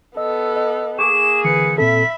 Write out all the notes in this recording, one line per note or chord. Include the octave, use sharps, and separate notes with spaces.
B3 A4 D#5 E6
D#5
A#3 G#4 C#6 D6 E7
D3 E3 B4 C#7
A#2 C4 A4 E5 B5 B6